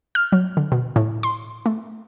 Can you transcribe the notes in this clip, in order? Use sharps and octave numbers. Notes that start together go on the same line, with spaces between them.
F6
F#3
D3
B2
A2
C6
A3